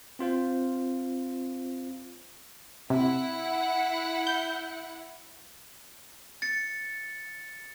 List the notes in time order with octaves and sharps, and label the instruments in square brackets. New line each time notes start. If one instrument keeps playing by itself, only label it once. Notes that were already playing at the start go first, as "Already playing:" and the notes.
[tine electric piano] C4 F4 C5 F5
[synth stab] C3 [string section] E4 F#5
[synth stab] G6
[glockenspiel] A6 C#7